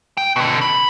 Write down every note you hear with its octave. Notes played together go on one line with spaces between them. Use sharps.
G5
B2 D3
B5